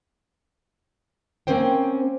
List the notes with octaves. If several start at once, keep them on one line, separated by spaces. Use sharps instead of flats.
A#3 C4 C#4 A#4 C5 G5